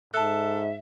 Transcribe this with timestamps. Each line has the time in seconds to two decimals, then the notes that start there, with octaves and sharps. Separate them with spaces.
0.14 G#2 A4 E5 A5 F#6